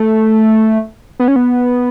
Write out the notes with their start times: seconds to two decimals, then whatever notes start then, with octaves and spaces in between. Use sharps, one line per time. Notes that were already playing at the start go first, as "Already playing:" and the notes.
Already playing: A3
1.20 B3
1.28 C#4
1.36 B3